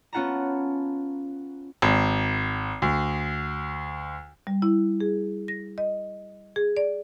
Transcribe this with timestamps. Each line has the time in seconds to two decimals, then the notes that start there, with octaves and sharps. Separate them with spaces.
0.13 B3 C#4 F4 F#5 A5 A#5
1.82 G#1
2.82 D2
4.47 G3
4.62 E4
5.00 G#4
5.48 A#6
5.78 D#5
6.56 G#4
6.77 D5